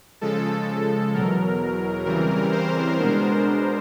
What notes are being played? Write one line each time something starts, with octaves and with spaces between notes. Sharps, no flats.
C#3 F3 G#3 A4
E2 B2 F#3 A#4
C#3 E3 G3 C4 A#4
A#4 C5
B2 G#3 B3 D4